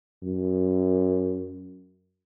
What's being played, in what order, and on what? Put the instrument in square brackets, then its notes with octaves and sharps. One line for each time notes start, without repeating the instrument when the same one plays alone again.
[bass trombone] F#2